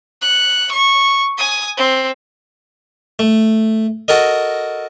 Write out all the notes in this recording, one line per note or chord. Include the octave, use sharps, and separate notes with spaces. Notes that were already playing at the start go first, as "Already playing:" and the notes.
F#6 C#7
C#6
G#5 D#6
C4
A3
F#4 A4 A#4 D#5